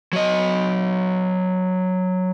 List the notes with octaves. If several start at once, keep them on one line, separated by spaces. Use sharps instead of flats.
F#3 D#5